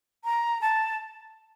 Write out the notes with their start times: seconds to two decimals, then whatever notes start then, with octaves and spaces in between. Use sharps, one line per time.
0.24 A#5
0.61 A5